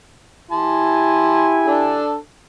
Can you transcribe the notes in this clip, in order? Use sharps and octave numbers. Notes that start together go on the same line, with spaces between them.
E4 G4 G#5 A5 C6
D4 A4